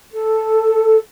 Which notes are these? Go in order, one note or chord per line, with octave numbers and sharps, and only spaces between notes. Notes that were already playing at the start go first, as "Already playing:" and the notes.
A4